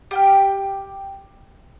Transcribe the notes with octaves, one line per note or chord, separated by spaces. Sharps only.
G4 G5 F6